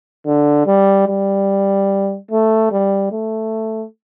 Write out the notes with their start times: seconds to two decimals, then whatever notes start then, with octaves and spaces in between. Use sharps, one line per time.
0.26 D3
0.67 G3
1.07 G3
2.31 A3
2.72 G3
3.12 A3